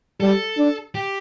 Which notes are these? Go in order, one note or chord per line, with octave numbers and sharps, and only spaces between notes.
G3 A4
D4
G4